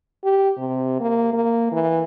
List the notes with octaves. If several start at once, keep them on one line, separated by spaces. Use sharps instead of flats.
G4
C3
A#3
A#3
E3